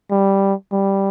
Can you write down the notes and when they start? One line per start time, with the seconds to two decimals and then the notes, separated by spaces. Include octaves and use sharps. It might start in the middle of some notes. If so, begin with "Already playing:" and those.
0.11 G3
0.72 G3